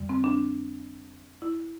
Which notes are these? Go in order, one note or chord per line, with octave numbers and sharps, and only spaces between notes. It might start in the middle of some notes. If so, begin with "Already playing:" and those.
Already playing: F2 D3 G3
C4
D4
E4